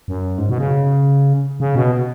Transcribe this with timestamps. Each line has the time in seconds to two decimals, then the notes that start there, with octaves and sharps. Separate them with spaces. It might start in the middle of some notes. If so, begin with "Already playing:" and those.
0.08 F#2
0.38 G#2
0.49 B2
0.58 C#3
1.60 C#3
1.75 B2